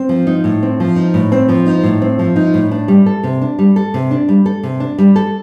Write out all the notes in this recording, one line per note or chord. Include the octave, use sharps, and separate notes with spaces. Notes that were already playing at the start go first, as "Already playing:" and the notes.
Already playing: C4
F3
D#4
A2
C4
F3
D#4
A2
C4
F3
D#4
A2
C4
F3
D#4
A2
D4
G3
A4
C3
D4
G3
A4
C3
D4
G3
A4
C3
D4
G3
A4